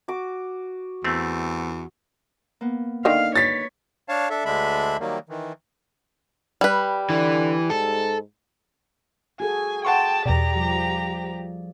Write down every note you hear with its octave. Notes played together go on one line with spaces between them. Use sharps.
F#4 D6
E2 A3 C4
A#3 B3
D3 D#3 F5
B4 C#5 A6 B6
D4 C#5 F5 A5
D4 A4 E5
D2 D3 G#3 D4 E5 B5
D#3 F#3 G3 A#3
D#3 E3
G3 B4
D3 E3
G#2 A4
F#4 G#4 A4 G#5
F#5 G5 A5 C6 C#6
E2 B2 G4 D5 A#5
F3 G3